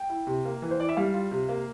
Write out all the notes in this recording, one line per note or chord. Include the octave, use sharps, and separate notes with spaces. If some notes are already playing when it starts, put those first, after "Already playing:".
Already playing: G5
E4
C3
A#3
E3
C5
E4 D5
E5
G3 F5
F4
C3
A#3